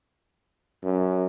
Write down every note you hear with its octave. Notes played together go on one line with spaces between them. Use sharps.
F#2